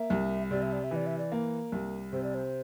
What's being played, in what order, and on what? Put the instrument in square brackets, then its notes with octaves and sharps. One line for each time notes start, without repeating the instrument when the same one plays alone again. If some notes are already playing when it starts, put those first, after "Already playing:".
Already playing: [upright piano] A#3 [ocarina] E5
[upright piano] C2
[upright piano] C3 [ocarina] D5
[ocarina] E5
D5
E5
[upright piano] E3 [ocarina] D5
[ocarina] E5
D5
[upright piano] A#3
C2
[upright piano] C3 [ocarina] C5
[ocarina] D5
C5